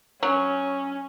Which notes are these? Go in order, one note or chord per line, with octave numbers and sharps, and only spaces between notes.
F#3 C#4